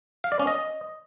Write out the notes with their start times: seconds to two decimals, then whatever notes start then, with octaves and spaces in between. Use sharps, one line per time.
0.24 F5
0.32 D5
0.40 C#4
0.47 D#5